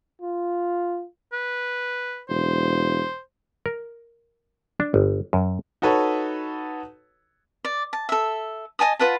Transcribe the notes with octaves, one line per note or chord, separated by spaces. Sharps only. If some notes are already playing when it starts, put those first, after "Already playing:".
F4
B4
E1 C5
A#4
D4
G1
F#2
D#4 F#4 A4 B4 C#5
D5
A5
A4 E5
D#5 G#5 A5 D#6
F4 B4 F#5 A5